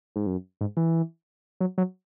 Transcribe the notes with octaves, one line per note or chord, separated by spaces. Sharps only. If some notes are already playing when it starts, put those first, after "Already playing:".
G#2
F#2
G#2
E3
F#3
F#3